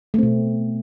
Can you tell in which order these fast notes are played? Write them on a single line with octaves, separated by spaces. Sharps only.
A3 C4 B2